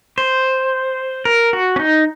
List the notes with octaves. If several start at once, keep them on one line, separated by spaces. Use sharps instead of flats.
C5
A#4
F#4
C#4
D#4